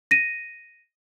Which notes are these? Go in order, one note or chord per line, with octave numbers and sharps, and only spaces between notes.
A#6 D#7